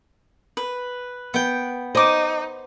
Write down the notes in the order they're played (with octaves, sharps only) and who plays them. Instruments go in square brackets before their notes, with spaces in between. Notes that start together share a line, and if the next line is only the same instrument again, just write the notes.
[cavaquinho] B4
[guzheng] B3 G5
[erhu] D#4 [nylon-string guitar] C5 [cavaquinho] D#5 D6